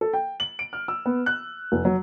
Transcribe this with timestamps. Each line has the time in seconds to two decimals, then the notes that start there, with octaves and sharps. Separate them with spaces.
0.01 A4
0.14 G5
0.40 F#7
0.59 D7
0.73 F6
0.88 E6
1.06 B3
1.26 F#6
1.72 F1
1.85 F#3